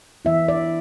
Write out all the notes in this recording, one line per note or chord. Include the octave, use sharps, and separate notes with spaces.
E3 B3 E4 E5
D5